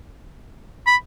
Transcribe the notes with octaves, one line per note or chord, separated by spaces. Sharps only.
B5